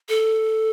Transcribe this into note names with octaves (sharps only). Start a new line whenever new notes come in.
A4